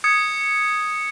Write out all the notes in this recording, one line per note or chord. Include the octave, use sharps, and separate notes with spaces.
D#6 G#6 C#7